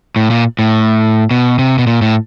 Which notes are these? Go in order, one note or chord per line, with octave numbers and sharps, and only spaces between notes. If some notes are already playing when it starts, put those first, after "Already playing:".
A2
A#2
A2
B2
C3
B2
A#2
A2